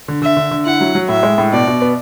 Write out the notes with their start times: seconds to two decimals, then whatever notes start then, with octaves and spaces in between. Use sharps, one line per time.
0.08 D3
0.22 D3 E5
0.36 D3
0.51 D3
0.66 E4 F#5
0.81 F#3
0.95 F#3
1.09 A2 E5
1.23 G#3
1.38 A2
1.52 B2 D5
1.67 B2
1.82 B3